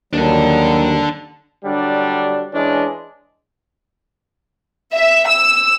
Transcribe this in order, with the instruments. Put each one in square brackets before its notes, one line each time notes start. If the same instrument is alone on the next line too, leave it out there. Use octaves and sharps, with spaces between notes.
[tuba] D#2 [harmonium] F#3 G3 [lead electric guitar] D4 A4
[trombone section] D3 F#3 G3 D4
E3 G#3 C#4 D4
[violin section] E5
E6